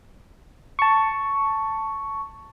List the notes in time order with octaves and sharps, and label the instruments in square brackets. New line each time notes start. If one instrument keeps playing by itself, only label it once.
[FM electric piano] A5 C#6